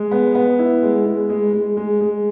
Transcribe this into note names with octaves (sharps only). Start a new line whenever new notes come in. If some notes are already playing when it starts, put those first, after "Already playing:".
Already playing: G#3
B3
B3
E4
G#3
G#3
G#3
G#3
G#3
G#3